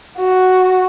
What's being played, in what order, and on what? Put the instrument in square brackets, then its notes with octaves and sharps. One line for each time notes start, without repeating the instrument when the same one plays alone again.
[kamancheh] F#4